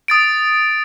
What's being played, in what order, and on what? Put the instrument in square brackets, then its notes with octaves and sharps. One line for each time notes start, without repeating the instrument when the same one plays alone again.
[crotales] D#6 A6 D7